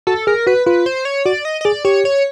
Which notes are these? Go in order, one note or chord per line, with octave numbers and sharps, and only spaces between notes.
F#4 A4
G#4 A#4
F#4 B4
F4 B4
C5
C#5
F#4 D5
D#5
D#5
G#4 D5
G4 C#5
C#5